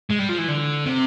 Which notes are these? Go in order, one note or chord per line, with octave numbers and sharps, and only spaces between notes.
G#3
G3
F3
E3
D3
C3